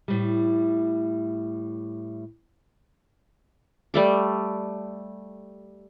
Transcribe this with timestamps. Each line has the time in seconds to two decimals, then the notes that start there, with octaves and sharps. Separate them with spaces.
0.08 A2 G3
3.94 G3 A3 D6